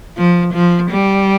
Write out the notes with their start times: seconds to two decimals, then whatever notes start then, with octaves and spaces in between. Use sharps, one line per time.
0.17 F3
0.53 F3
0.90 G3